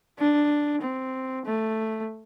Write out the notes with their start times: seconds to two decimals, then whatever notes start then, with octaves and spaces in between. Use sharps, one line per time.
0.19 D4
0.82 C4
1.46 A3